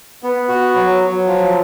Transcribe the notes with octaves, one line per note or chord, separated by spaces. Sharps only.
B3
F#4
F#3
F#3
F3